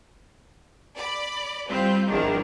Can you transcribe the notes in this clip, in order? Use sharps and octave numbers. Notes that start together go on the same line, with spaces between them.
D5 B5
G3 C4 F4 B5 G6
G#1 E2 D#3 F3 D4